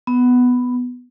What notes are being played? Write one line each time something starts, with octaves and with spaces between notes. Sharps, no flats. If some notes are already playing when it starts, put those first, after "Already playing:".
B3